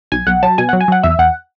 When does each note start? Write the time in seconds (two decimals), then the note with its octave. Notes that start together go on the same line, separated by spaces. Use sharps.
0.12 B1 G#5
0.27 B1 F#5
0.43 F#3 A5
0.58 B2 G#5
0.69 F#3 F#5
0.81 G#5
0.88 F#3 F#5
1.03 E2 E5
1.19 E2 F#5